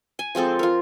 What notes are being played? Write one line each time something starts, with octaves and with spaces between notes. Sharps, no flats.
G#5
F3 G#3 C4 A4
F4 A#4